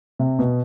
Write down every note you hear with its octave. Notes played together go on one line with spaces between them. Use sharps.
C3
B2